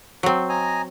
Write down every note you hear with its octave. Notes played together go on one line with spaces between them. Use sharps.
F#3 C4
D#5 G#5 A#5